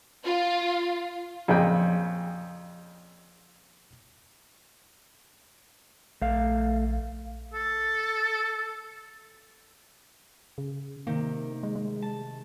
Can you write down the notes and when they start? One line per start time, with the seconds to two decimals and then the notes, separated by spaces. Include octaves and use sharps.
0.25 F4
1.48 F2 A#2 C#3 G5
6.22 A#1 A3 F5
7.54 A4
10.58 C#3
11.07 C3 D#3 A#3
11.63 G#3
11.76 G#3
12.02 A5